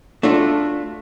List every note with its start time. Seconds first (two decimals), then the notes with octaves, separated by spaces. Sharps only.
0.23 A3 D4 F4 F#4 A4